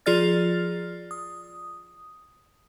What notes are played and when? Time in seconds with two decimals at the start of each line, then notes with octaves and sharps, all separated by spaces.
0.06 F3 F4 G#4 D5 F6 A6
1.11 D#6